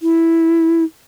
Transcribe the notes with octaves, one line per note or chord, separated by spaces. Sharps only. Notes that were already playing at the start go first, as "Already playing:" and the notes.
E4